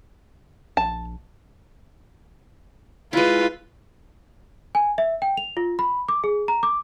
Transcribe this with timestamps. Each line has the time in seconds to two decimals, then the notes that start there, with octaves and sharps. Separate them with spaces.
0.77 A#1 A5
3.13 G#3 E4 F4 B4
4.75 G#5
4.98 E5
5.22 G5
5.37 F7
5.57 F4
5.79 B5
6.09 D6
6.24 G#4
6.48 A#5
6.63 D6